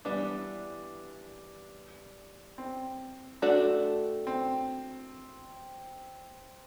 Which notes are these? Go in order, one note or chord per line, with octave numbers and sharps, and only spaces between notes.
E3 G3 B3 D4
C4
A3 D4 F#4 A4 D5
C4